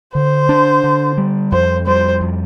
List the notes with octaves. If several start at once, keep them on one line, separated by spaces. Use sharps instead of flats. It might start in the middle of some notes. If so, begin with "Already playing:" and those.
D3 C5
D4
D3
G3
F2 C5
G3 C5
F2